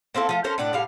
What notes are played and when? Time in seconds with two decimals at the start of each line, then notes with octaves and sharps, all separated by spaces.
0.15 A#3 C4 E4 A4
0.29 F3 A3 F4
0.44 C#4 A4 A#4 C5
0.58 A2 D4 D5 F#5
0.73 A2 G3 F5